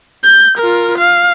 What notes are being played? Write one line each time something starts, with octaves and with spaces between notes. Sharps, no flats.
G6
F4 A#4
F5